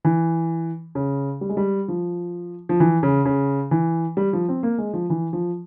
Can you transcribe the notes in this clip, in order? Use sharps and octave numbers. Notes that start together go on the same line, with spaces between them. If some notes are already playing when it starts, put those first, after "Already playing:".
E3
C#3
G3
G#3
G3
F3
F3
E3
C#3
C#3
E3
G3
F3
C4
A#3
G#3
F3
E3
F3